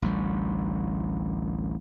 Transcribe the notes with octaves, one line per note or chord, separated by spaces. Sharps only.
A1 D2 G3